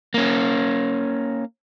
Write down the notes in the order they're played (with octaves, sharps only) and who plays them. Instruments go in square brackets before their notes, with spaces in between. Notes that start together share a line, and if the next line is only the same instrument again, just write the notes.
[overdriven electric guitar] A#3 C#4